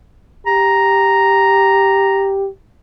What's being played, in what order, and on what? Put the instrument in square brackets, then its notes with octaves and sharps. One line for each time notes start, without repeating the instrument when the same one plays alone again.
[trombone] G4 [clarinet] A#5